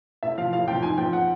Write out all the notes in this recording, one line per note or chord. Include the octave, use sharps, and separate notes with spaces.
A2 E5
F3 F5
A2 F5
F3 G5
G#2 G#5
F3 G5
F#5